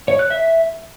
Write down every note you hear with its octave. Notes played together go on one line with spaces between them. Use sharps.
C#5
F#6
E5